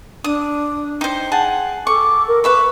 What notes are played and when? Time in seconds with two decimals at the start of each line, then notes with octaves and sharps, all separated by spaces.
0.24 D4 D#6
1.01 D#4 C5 G5
1.32 G#4 F#5 A5
1.87 A4 C#6 D6
2.28 A#4
2.44 B4 E5 B5 C#6